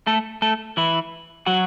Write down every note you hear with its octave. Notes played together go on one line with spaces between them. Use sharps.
A3 A4
A3 A4
E3 E4
F#3 F#4